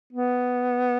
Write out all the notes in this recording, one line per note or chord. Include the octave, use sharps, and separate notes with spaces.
B3